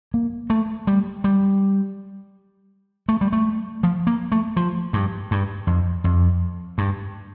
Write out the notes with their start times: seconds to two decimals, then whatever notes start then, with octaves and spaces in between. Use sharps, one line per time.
0.14 A#3
0.50 A3
0.87 G3
1.24 G3
3.09 A3
3.21 G3
3.33 A3
3.83 F3
4.07 A#3
4.32 A3
4.57 F3
4.93 G2
5.31 G2
5.67 F2
6.04 F2
6.78 G2